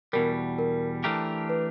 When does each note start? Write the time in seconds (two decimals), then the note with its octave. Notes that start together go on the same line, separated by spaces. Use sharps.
0.13 E2 B2 G3 A#4
0.59 A#4
1.04 E3 A3 D4 G4 A#4
1.49 B4